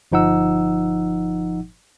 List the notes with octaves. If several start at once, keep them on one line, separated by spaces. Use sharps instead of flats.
G1 F3 D#4 F#5 E6